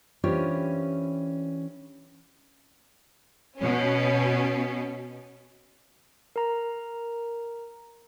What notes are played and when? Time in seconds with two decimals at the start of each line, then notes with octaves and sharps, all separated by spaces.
0.23 E3 C#4 D4 F4 G4 C5
3.58 B2 C#4
6.36 A#4 A#5